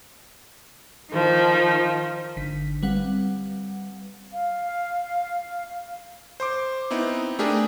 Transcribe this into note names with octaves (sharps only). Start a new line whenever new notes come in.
D#3 F3
G#1 D3 B6
G3 C4 B4 F5 F#5
F5
C5 C6 D6
B3 C4 D#4 E4
A3 D4 G4 G#4 A#4